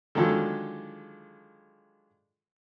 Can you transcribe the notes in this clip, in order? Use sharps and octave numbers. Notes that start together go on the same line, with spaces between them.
D3 D#3 F3 F#3 G#3 A4